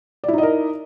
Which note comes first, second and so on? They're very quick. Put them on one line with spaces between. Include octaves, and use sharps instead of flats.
D5 E4 D#4 D#5 A#4